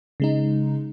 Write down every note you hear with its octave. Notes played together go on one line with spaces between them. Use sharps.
C#3 G#3 D#4